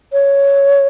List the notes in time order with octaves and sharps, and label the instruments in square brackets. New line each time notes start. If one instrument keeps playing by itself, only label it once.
[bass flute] C#5